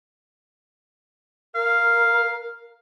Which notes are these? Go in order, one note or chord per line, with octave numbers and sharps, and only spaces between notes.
A#4 F5